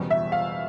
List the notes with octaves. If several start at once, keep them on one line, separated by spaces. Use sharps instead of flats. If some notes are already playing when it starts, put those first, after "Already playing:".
Already playing: F#1 E2 B2 G3
E5
F5